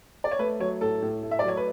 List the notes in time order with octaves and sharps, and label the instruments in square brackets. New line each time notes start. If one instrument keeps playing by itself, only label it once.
[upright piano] D5
C#5
A3 B4
F#3 C#5
A2 A4
A2
A3
E5
D5
F#3 C#5
B4